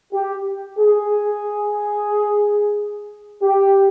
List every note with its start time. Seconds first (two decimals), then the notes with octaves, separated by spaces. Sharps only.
0.13 G4
0.79 G#4
3.42 G4